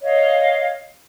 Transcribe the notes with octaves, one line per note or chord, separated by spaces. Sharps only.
C#5 D#5 F5